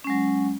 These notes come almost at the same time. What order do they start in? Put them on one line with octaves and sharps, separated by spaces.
C#4 G#3 F#3